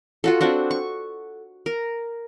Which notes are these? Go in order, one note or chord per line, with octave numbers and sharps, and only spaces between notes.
F4 F#4 A4
C4 D4 F#4
C#6
A#4